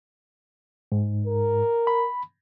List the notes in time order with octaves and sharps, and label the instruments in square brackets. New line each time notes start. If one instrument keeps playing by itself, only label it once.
[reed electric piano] G#2
[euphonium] A#4
[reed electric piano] B5